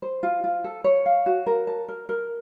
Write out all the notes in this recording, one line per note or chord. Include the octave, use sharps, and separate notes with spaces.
C5
F4
F4
A4
C#5
F5
F#4
A#4
A5
A#4
A#4